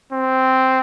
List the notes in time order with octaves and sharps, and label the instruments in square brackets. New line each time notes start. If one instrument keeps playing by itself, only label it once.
[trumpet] C4